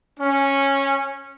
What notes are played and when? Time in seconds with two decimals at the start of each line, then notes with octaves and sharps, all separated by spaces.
0.19 C#4